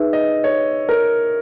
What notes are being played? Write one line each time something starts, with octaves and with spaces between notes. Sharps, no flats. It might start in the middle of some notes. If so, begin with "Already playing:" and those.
Already playing: D#4 G#4 B4 E5
D#5
C#5
A#4